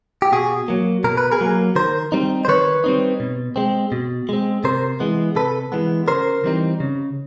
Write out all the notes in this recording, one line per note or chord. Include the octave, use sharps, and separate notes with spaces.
G4
B2 F#4 G#4
F#3 A#3
B2 A#4
B4
G#4 A#4
F#3 A#3
D#3 A#4 C5
G3 C4 D#4
C5
D#3 B4 C#5
G3 C4 D#4
B2
G#3 C4
B2
G#3 C4
C3 A#4 C5
E3 G#3 B3
C3 A4 B4
E3 G#3 B3
C#3 A#4 C5
E3 G3 C4 D#4
C#3